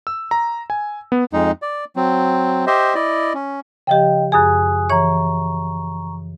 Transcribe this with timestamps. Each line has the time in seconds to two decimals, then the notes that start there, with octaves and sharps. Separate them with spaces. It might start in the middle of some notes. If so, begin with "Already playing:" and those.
0.07 E6
0.31 A#5
0.70 G#5
1.12 B3
1.33 F2 G#3 D#4
1.62 D5
1.96 F#3 C4
2.67 G4 C5 D#5 E5
2.95 E4 D5 D#5
3.35 C#4
3.87 C#3 F3 G4 D#5 G5
4.32 F#2 G#4 G#5 D#6 F#6
4.90 E3 C#5 A#5 C#6